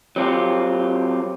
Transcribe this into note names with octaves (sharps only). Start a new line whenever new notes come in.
F#3 C4 F4 G4